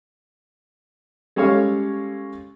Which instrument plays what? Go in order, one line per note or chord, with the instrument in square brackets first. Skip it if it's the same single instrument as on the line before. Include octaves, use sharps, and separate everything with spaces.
[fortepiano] G3 G#3 C#4 A4 C#5 F5